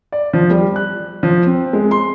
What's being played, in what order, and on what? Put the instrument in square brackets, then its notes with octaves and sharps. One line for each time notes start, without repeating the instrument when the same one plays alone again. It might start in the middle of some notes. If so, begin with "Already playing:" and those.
[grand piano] D5
F3
G3
F#6
F3
C4
G#3
C6